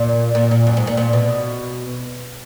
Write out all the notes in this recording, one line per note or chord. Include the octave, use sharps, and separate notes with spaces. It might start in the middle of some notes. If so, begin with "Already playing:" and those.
Already playing: A#2
A#2
A#2
F#2
G#2
A#2
A#2
B2